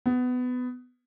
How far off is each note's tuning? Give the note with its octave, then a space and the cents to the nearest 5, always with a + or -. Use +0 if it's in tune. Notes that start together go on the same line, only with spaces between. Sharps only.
B3 +20